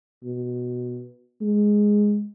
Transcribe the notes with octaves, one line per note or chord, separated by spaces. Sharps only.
B2
G#3